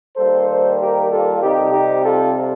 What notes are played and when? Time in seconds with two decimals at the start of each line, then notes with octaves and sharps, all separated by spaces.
0.17 D#3 G3 A#3 A4 C5
0.80 G4 A#4
1.10 F4 A4
1.41 C3 G3 C4 D#4 G4
1.73 D#4 G4
2.04 F4 A4